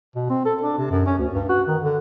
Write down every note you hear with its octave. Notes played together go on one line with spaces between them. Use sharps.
B2
C4
A4
D4
C3
F#2
C#4
D2
G2
F#4
D#3
D3